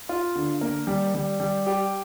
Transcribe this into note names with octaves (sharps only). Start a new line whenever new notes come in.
F4
D3
A#3
G3
G3
G3
G4